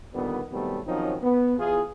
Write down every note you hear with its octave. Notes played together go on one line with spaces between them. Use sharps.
A#2 D3 D#3 G3 B3
C3 D#3 F#3 G3 A3 B3
D#3 F3 F#3 C4 C#4 D#4
B3
E2 F4 G#4